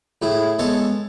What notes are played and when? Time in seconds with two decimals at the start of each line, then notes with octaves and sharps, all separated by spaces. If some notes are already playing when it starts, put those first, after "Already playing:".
0.22 A2 E4 G#4
0.59 G#3 B3 A4 C#5